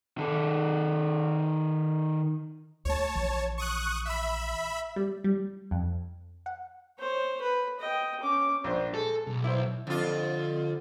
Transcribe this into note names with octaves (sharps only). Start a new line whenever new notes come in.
D#3 A4
D2 A3 C#5 A5
A#1 E3
C#6 D#6 F#6
E5 B5
G3
G3
F2
F#5
C5 C#5
B4
D#5 G5
C#4 D6
A#1 D4 C5
G#3 A4
B1
E4 C5
F2 D3 F4